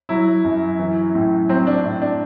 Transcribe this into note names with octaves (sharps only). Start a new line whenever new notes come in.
F#3 E4
F#2
E3
A2
F#3 C4
D4
A2 D4
D4